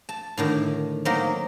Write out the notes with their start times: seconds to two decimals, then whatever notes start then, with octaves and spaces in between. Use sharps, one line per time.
0.09 A5
0.37 A2 D3 D#3
1.05 F#3 A#3 C4 D#4 A#4